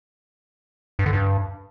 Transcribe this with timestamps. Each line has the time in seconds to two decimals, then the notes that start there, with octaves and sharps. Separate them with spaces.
0.99 G2
1.06 D3
1.13 G2